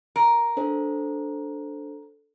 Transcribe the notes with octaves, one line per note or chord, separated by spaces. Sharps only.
A#4
D4 A4 C5